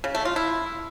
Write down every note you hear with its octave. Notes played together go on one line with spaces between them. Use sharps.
C#3
A3
F4
E4